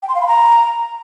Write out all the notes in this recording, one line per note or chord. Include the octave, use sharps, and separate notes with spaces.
G5
C6
F5
B5
A#5